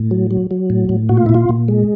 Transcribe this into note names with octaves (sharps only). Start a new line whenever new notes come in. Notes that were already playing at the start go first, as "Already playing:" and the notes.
Already playing: A2
F#3
F#3
F#3
A2
A2
A#2 F#4
F4
A#2 E4
F4
A#2
G#3